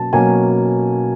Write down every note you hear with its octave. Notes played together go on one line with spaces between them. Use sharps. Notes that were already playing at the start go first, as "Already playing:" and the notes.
Already playing: B2 F#3 A#3 C#4 A5
B2 F#3 A#3 C#4 G#5